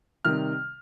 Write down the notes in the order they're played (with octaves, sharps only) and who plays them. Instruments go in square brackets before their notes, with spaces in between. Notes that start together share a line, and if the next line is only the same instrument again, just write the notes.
[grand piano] C3 D#3 G3 F6